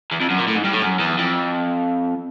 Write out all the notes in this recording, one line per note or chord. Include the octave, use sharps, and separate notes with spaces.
E2
F2
F#2
A#2
A2
G#2
G2
A2
F#2
E2
F2